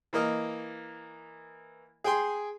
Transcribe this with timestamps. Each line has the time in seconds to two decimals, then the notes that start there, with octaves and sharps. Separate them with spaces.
0.13 E3 A#3 A#4 D#5
2.04 G#4 G5 G#5 C6